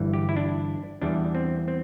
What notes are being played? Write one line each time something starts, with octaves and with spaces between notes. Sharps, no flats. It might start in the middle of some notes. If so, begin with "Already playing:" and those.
Already playing: G1 G2 E3 G3
G4
E4
D4
E2 E3 G3 D4
C4
C4